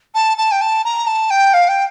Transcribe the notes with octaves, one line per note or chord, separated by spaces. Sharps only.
A5
A5
G5
A5
A#5
A5
G5
F5
G5